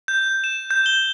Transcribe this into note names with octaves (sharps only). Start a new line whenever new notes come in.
G6
E7
G6
G7